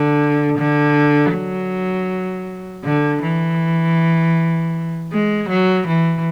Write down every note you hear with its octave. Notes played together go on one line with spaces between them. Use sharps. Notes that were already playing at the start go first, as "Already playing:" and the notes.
Already playing: D3
D3
F#3
D3
E3
G#3
F#3
E3